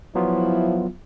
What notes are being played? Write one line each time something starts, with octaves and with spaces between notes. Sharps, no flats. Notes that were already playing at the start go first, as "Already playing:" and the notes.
F3 F#3 B3 E4 F4